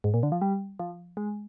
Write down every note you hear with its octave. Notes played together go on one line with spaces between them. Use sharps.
G#2
A#2
D3
F3
G3
F3
G#3